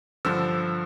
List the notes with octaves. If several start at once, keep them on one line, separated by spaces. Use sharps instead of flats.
G2 D3 F3 E6